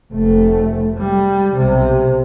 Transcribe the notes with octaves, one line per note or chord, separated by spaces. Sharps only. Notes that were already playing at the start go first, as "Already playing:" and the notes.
F1 A3
G3
B1 C3